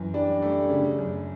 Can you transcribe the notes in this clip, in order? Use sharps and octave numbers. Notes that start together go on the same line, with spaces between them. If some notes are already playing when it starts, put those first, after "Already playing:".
Already playing: F#2 E3
G3 D4
A3
C#3
F#2